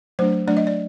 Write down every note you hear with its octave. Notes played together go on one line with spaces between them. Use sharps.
F#3 A3 D4 C5
F#3 A3 D4 D5
D#5
D5